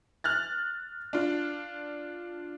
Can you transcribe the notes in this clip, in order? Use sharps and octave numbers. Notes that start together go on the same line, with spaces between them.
F6 F#6 A6
D4 F4